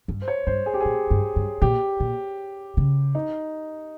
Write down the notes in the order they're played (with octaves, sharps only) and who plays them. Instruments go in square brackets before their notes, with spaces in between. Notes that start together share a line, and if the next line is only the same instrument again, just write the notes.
[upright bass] G2
[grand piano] C5
C#5
[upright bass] G2 [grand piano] C5
[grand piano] G#4
G4
[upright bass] A#2 [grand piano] G#4
[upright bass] G2
G2
[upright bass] A#2 [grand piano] G4
[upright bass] A#2
C#3
[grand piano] D#4